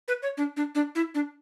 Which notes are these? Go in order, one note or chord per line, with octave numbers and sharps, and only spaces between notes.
B4
C#5
D4
D4
D4
E4
D4